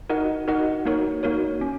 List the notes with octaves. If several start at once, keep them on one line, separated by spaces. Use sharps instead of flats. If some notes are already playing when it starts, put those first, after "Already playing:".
D#4 F#4 A#4 D#5 F#5
D#4 F#4 A#4 D#5 F#5
A#3 D#4 F#4 A#4 C#5
A#3 D#4 F#4 A#4 C#5
C#4